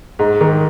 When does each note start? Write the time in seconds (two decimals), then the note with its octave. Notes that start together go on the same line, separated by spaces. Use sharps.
0.19 G#2
0.41 D#3